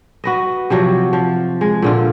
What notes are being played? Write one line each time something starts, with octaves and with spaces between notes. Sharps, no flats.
F#4 B4 D#5
C3 F3 F#3 F#4
F3
G#3
A#2 D3 F4